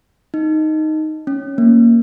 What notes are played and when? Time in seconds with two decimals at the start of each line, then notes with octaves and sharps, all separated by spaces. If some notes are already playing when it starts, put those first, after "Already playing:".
0.34 D#4
1.27 C#4
1.58 A#3